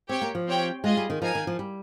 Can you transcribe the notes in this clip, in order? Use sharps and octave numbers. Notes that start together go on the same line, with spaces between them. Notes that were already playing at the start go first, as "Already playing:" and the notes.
C4 G4 C#5 G5
A#3
F3
C4 G4 C#5 G5
G#3 F4 G#4 D#5
G3
D#3
F3 D#4 A#4 F5 G#5
D#3
F3
G3